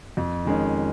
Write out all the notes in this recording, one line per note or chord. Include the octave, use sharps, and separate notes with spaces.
F2
D#3 G#3 C#4